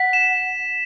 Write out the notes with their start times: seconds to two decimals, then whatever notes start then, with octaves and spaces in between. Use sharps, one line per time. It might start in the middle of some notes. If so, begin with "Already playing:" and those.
Already playing: F#5 B6
0.13 E7